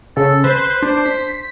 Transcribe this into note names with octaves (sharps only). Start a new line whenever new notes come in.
C#3 A4
B4 C5
D4 C5
B6